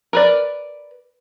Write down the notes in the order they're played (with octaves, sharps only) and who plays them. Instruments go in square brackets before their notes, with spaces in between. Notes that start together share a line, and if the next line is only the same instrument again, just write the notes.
[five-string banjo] A#4 B4 D5